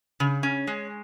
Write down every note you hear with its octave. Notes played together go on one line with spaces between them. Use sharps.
C#3
C#4
G#3